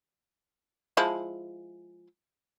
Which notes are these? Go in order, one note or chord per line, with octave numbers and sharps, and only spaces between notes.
F3 G#3 E4